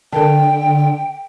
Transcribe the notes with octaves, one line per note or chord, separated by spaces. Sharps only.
D3 A4 A#4 G5 A5